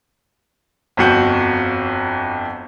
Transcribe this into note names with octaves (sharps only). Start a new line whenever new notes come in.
G1 F2 F#4 G6